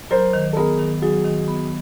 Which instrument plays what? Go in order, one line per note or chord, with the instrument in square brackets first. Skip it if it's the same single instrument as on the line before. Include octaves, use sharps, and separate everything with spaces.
[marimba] F#3 [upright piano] A#4 C5
[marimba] D#3
[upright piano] A4
[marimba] B3 [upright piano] G#4 A#4
[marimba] D#3
[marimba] F#3 [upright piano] F#4 G#4
[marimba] D#3
B3